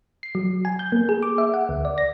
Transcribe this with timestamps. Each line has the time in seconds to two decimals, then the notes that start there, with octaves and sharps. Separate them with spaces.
0.23 C7
0.35 F#3
0.65 G#5
0.79 G6
0.92 A#3
1.09 G#4
1.23 D6
1.38 E5
1.54 F#5
1.69 D2
1.85 D5
1.98 A#6